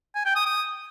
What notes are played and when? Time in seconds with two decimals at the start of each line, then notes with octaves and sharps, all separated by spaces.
0.15 G#5
0.25 G5
0.36 D#6
0.46 D#6